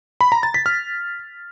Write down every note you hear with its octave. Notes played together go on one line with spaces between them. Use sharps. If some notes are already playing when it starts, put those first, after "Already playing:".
B5
A#5
A6
B6
F6